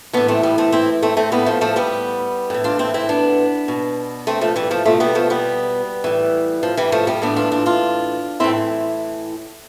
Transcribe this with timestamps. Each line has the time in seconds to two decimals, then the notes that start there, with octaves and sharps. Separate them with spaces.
0.13 A2 E3 B3 D4
0.28 A3 C4
0.43 G3 B3
0.58 A3 C4
0.72 C4 E4
1.03 A3 C4
1.17 A3 C4
1.32 A2 E3 G3 B3
1.46 F3 A3
1.61 F3 A3
1.76 G3 B3
2.50 A2 E3
2.64 D4 F4
2.79 C4 E4
2.94 C4 E4
3.09 B3 D4
3.68 B2
4.27 A3 C4
4.41 F3 A3
4.56 E3 G3
4.71 F3 A3
4.85 B2 F3 A3
5.00 G3 B3
5.15 F3 A3
5.30 G3 B3
6.04 A2 E3
6.63 F3
6.77 E3 G3
6.92 F3 A3
7.07 G3 B3
7.22 A2 E3 B3 D4
7.36 D4 F4
7.52 D4 F4
7.66 D4 F4
8.40 A2 E3 C4 E4